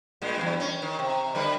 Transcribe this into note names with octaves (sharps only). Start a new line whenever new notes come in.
G2 A#2 G#3
E2 G2 B2
C#4
D#3
C3
D3 G3 B4